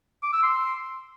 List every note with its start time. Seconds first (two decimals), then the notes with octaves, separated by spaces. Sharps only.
0.22 D6
0.33 E6
0.43 C6